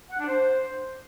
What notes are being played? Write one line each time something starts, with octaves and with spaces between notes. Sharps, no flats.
F#5
D4
C5